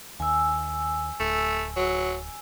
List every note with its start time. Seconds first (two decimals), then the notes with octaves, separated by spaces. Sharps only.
0.20 D#2 G#5 E6
1.20 D1 A3
1.77 F#3